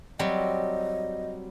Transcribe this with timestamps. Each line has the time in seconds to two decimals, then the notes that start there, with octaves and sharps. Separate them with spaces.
0.19 F#3 G3 C4 D#5